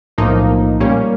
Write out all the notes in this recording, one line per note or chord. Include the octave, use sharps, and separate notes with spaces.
B1 A2 F3 A#3 D#4
A#2 G3 A#3 C#4